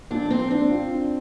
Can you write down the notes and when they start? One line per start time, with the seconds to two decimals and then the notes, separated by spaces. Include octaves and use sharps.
0.11 A#2 D4
0.30 A#2 C4
0.50 C4 D4
0.71 F4
0.90 D4